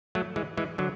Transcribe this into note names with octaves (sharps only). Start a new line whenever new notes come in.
F#3 A3
E3 G#3
E3 G#3
D3 F#3